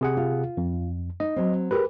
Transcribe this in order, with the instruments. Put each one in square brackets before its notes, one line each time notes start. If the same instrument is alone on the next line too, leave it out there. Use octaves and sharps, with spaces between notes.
[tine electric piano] C3 G#4 F#5
[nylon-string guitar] F4
[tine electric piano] F2
[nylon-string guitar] D#4 [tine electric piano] D#5
[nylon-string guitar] F#3 C4
[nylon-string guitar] G4 G#4 A#4 [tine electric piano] B4